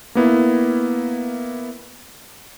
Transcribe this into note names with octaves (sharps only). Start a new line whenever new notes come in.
A#3 B3 E4